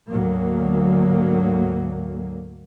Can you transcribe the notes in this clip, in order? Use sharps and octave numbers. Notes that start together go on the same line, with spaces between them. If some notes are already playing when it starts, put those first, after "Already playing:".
D2 G#2 F#3 A#3